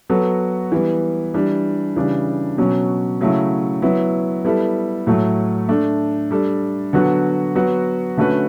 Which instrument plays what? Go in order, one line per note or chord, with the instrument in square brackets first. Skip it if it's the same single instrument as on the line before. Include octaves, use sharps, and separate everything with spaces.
[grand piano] F#3 B3 F#4 A4
E3 G3 B3
E3 G3 D4
C#3 E3 G3 D4
B2 F#3 C#4
C#3 F#3 A3 E4
F#3 B3 E4
G3 B3 E4 A4
A2 F#3 A3
A3 D4 A4
G3 D4 A4
D3 F#3 B3 F#4
F#3 B3 F#4
D3 A3 C#4 F#4 B4